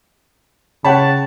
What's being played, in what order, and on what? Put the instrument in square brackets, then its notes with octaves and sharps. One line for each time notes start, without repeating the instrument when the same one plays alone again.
[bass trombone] C#3 [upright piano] C#5 [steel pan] F#5 G5 B5 [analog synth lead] A5